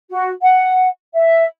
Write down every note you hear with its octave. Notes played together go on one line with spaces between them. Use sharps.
F#4
F#5
E5